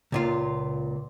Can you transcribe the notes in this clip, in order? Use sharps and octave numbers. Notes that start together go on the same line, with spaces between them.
C#2 A#2 F4